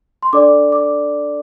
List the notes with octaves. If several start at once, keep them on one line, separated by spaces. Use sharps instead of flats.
C6
D4 A4 D5 D6
D6